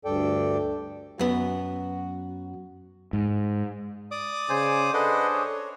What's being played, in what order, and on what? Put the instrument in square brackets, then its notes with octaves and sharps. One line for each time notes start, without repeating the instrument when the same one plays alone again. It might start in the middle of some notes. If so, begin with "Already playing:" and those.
[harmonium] D2 G2 A4 D5 G5
[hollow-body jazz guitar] F#2 B3 [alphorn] F#4
[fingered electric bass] G#2
[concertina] D5 D6 D#6
[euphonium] C#3 [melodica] C5 G#5
[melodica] D4 G#4 C5 [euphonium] A4 [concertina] B4 D#5 F#5
[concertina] C#5